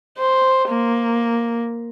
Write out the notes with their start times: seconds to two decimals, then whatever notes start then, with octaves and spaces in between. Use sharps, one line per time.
0.18 C5
0.69 A#3